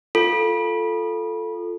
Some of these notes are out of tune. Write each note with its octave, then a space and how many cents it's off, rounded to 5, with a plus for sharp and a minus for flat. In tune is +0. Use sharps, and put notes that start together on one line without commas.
F4 +0 A4 +0